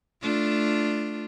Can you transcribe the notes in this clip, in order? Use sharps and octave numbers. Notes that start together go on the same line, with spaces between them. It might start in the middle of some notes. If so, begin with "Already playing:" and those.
A3 D4 F4